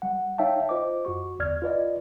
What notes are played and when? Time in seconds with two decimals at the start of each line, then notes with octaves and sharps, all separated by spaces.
0.02 G3 F#5
0.38 D#4 C#5 E5 F5 G5 A5
0.69 F4 C5 D#5 D6
1.05 F#2 F#4 C#6
1.39 G1 E2 D5 F6 G#6
1.62 F4 B4 D5 D#5